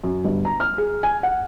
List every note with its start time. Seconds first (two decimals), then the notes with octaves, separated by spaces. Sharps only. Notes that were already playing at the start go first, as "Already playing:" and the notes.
0.04 F#2
0.24 G1
0.45 A#5
0.60 F6
0.78 G#4
1.03 G#5
1.23 F#5